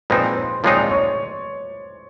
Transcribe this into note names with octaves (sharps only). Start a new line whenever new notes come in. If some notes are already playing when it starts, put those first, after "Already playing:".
A#2 F3 G#3 C4 D#4 B4
C5
A#2 F3 G#3 C4 D#4 C#5
D5
C#5